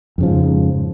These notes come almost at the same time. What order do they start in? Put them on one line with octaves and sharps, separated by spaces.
F2 C#3 F3 G#2